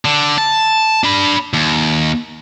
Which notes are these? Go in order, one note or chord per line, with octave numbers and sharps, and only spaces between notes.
D3
A5
D4 B5
D#2